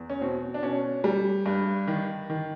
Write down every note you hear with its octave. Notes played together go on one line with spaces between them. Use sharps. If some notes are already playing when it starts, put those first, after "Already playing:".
Already playing: E2
C#4
B2 C4
D4
B2 C#4
G3
G2
D#3
D#3